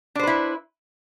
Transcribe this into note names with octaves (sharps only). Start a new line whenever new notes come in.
D4 E4 B4 C5